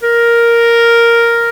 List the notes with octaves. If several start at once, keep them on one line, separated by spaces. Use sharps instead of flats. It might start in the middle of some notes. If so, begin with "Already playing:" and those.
A#4